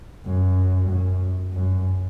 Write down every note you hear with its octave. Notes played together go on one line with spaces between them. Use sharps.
F#2
F#2
F#2